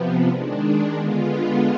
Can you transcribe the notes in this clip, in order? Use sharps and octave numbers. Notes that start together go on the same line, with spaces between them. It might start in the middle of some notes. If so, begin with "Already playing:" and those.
Already playing: C3 F3 B3
D#3 G#3 D4
D3 G#3 B3 F4